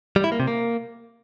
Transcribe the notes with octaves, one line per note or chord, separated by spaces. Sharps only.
G3
E4
A#3
C3
A#3